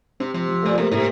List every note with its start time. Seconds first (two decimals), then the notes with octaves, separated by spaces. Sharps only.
0.20 C3 C4
0.34 C3 F3
0.48 F3
0.63 A#2 A3
0.78 C3 A#3
0.91 A2 C3